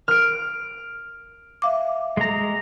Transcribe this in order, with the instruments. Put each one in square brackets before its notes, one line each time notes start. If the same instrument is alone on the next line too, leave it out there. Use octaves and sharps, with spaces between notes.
[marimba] A#4 [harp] F6 D7
[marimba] E5 F5 D6
[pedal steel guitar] G#3 A#5